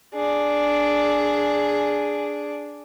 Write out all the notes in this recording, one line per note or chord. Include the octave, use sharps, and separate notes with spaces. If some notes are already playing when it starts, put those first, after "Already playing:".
D4 G#4